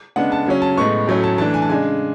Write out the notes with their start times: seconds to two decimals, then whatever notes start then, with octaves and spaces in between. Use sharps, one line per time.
0.16 C#3 G#3 B3 D4 F#5
0.32 A5
0.46 C#3 F#3 C#4
0.62 A5
0.77 A2 G#3 B3 C#6
1.07 A2 F#3 A3 C#4
1.24 A5
1.38 E3 A3 D4 A5
1.54 G#5
1.62 A5
1.69 C#3 G#3 D4 G#5